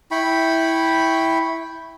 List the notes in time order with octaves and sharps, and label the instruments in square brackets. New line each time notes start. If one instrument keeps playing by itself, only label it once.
[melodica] E4 G5 B5 C#6